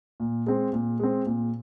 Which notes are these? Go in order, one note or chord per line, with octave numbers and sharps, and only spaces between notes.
A#2
G#3 C4
A#2
G#3 C4
A#2